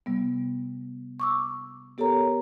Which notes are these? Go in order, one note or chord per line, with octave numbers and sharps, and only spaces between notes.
C3 G3 B3
C#6 D6 E6
B3 G4 A4 A#4 C#5 A#5